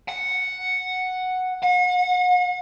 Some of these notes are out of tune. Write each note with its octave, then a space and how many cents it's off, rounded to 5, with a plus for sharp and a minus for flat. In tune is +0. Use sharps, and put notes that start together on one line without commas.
F#5 +0
F#5 -40